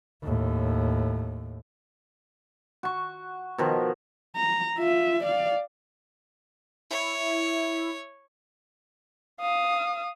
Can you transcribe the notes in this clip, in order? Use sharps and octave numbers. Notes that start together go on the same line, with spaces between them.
D#2 A2
F#4 C#6
B2 D#3 F3
A#5
F4 E5
D5 F5
E4 C#5
F5 D#6